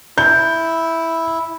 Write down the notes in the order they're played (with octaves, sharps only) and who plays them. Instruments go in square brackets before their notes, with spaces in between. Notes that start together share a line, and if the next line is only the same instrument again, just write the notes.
[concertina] E4 [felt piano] G6